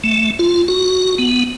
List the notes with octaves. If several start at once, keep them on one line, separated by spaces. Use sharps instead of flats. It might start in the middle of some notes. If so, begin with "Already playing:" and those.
A3
F4
F#4
B3